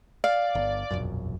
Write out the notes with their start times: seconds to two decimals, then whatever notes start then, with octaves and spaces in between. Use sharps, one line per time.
0.24 D5 F5
0.55 G1
0.91 E1 A#1 F#2